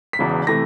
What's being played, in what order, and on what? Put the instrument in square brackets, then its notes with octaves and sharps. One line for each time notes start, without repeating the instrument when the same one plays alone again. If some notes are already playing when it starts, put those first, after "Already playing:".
[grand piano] B6
E1 E2 C#3
C3 E3 A3 A#6